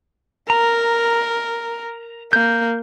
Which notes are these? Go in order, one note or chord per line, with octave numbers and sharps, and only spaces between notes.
A#4 A#5
A#3 G6